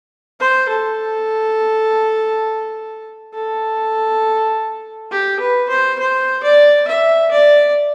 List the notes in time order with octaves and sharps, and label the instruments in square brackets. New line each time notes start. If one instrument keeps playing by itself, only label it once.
[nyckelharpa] C5
A4
A4
G4
B4
C5
C5
D5
E5
D5